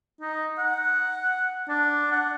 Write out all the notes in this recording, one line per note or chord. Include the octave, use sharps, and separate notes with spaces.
D#4
F#5
D4
F#5